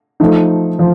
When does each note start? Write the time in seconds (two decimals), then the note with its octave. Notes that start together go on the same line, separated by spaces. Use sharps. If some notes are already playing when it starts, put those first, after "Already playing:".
0.20 F3 A3 D#4
0.79 F3